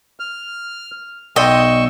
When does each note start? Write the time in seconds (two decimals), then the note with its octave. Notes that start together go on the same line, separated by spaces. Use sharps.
0.20 F6
1.36 B1 D5 D#5 G5 C6 C#6 E6